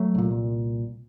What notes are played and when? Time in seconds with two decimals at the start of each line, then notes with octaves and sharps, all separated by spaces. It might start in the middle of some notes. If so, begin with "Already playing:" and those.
Already playing: F#3 A3
0.15 C2 A#2